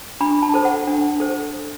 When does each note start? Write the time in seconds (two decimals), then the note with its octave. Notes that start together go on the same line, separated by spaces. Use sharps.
0.21 D4 B5
0.42 A5
0.54 A4 C5
0.65 F#5
0.87 D4
1.20 A4 C5